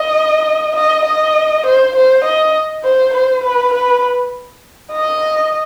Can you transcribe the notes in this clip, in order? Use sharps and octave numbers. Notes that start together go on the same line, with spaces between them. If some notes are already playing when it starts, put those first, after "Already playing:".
Already playing: D#5
D#5
D#5
C5
C5
D#5
C5
C5
B4
B4
D#5